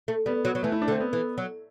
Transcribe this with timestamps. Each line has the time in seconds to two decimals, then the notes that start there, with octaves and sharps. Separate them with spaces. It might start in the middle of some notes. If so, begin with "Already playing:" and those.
0.08 A3
0.26 G3 B3
0.45 F#3
0.55 F#3
0.63 E3 A3
0.72 E4
0.82 D4
0.88 D3
0.91 C4
1.00 B3
1.13 E3
1.38 F#3